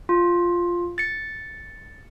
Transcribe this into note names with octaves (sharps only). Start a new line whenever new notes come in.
F4
A6 C#7